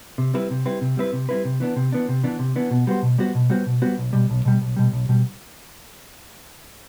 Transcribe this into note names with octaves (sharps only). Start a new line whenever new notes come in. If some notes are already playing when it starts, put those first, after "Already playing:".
C3
G3 C4 E4 B4
C3
G3 C4 E4 B4
C3
G3 C4 E4 B4
C3
G3 C4 E4 B4
C3
E3 B3 D4
C3
E3 B3 D4
C3
E3 B3 D4
C3
E3 B3 D4
B2
G3 B3 F#4 C5
B2
G3 B3 F#4 C5
B2
G3 B3 F#4 C5
B2
G3 B3 F#4 C5
B1
B2 G3
B1
B2 G3
B1
B2 G3
B1
B2 G3